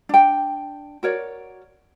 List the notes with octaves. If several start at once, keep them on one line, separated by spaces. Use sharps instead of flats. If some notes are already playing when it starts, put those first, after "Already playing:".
D4 G5
F#4 A#4 C#5 D5